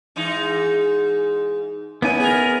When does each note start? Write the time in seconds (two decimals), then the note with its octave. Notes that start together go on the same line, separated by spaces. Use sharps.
0.16 G#2 E3 D#4
2.02 B3 C#4 D#4 E4 G#5
2.20 G#4 A#4